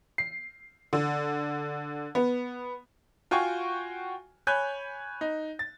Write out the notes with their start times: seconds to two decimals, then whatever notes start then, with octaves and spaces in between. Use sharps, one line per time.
0.18 C7
0.93 D3
2.15 B3
3.31 F4 F#4 G5 G#5 C#6
4.47 C#5 G#5 B5 F#6 G6
5.21 D#4
5.59 A6